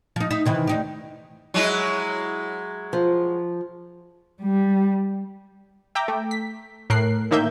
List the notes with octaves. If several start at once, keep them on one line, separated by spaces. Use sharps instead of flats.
F3 D#4
D#4 E5
C3 D#3 E3
D2 D#4 G4
F#3 G#3 E4
F3
G3
E5 G5 A#5 D6
A3
B6
A2 A#4 F#6 C7
A2 D#3 A#3 E5 G6